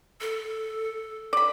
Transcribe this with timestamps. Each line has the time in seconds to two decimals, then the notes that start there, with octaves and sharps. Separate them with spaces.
0.21 A4
1.33 D5 B5